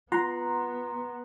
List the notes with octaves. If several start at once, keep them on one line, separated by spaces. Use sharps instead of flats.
B3 F4 F#5 A#5 C6